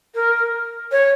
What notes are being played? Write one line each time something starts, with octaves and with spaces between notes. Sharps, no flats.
A#4
C#5